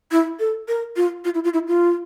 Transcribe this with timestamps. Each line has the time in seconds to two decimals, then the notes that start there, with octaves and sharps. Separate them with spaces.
0.11 E4
0.40 A4
0.68 A#4
0.96 F4
1.25 F4
1.35 E4
1.44 F4
1.54 E4
1.68 F4